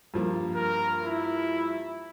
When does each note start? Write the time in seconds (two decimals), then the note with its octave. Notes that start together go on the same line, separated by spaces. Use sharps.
0.14 G2 F3 A#3
0.55 A#4
1.04 E4